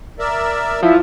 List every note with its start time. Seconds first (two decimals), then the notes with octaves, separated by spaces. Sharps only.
0.19 A#4 D5 E5
0.82 F3 E4